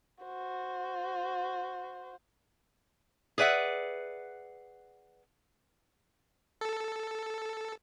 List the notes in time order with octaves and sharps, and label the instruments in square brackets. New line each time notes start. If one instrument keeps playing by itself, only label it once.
[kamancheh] F#4 C5
[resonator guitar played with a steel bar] G#4 B4 D5 E5 F#5
[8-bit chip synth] A4